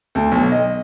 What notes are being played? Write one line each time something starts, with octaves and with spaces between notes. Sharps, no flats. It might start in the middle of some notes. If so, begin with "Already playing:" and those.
D2
B1
D#5